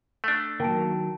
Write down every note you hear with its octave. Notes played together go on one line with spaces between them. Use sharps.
A3 D4
D#3 F#3 A#3 G5 A5 D7